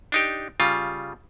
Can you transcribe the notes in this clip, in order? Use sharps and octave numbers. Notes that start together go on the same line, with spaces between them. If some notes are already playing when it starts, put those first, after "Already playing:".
D4 D#4 G4
C#3 G3 F4